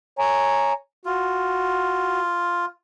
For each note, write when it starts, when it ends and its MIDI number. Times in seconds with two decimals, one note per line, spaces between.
0.19 0.72 73
0.19 0.72 80
0.19 0.72 82
1.05 2.66 65
1.05 2.20 66